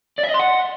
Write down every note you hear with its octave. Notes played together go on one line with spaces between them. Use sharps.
D5
E5
D#5
C6
F#5